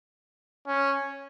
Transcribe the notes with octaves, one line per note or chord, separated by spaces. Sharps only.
C#4